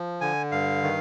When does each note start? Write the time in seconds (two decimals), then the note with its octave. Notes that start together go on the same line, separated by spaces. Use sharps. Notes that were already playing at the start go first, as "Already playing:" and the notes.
Already playing: F3
0.21 D3 G#5
0.52 G2 F5
0.83 D#3